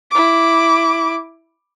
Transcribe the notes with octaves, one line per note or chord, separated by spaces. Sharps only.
E4 D6